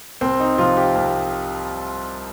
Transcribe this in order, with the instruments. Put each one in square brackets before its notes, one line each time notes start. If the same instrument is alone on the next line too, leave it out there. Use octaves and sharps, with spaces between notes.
[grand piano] C2 C4
D#4
C3 F3 F4
G4
C2